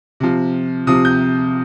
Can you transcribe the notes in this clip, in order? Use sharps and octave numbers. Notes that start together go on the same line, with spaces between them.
C3 F3
C3 F3 D#6
G6